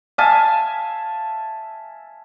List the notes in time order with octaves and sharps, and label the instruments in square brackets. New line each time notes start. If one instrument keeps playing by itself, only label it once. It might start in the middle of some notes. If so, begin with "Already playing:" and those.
[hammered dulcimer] E5 F5 G#5 A5